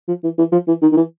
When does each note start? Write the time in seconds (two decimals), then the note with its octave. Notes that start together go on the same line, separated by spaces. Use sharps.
0.08 F3
0.24 E3
0.38 E3
0.52 F3
0.68 E3
0.82 D#3
0.92 D#3
0.97 E3